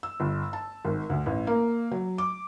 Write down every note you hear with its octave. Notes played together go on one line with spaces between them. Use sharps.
E6
G1
A5
G#1
D2
A1
A#3
F#3
D6